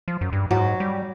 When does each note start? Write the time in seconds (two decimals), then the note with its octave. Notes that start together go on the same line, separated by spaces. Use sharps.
0.08 F3
0.21 F#2
0.33 G2
0.51 G#2 F#3
0.80 G3